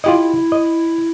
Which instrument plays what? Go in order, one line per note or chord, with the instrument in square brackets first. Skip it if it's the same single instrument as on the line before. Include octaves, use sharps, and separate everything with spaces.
[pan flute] E4 [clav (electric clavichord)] F4 G4 D#5
[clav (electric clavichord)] D#5